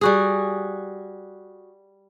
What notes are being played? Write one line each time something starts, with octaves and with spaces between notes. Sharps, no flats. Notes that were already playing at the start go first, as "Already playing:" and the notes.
G3 F#4 G#4